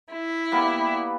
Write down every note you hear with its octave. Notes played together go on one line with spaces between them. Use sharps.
E4
G3 A#3 B3